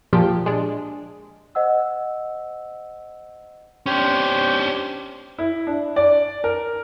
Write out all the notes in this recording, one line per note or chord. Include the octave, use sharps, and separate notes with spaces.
A#2 F3 G4
G#3 D4
C5 D#5 F#5 E6
C#4 D4 G4 C5 C6
E4
D4
D5
A#4